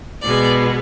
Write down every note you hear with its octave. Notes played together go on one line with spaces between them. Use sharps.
B2 G#3 B3 D5